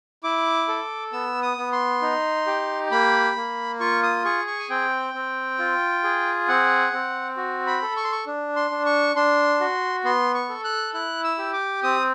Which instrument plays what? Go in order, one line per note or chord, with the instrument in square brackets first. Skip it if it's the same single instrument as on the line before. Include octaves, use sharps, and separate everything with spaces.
[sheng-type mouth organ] E4 D6
A4
B3 E6
D#6
B3
C6
D#4
G4
A#3 B5
A#3
F4 C#6
D#6
G#4 C#6
C#6
G#5
C4 G5
C4
F4
G#4
C4 F#5
C4
F#4
B5
A4
C#6
C6
C#6
D4
C6
D4
C#6
D4 C6
F#4
B3 C6
C#6
A4
F#6
E4 F#6
E6
G4
D6
C4 D#6